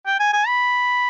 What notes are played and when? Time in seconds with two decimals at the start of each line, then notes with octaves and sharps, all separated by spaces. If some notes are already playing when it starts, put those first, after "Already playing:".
0.06 G5
0.20 G#5
0.33 G#5
0.47 B5